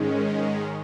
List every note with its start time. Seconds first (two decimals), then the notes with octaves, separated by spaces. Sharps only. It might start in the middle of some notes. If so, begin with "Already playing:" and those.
Already playing: G#2 D#3 G#3 C#4
0.20 D#5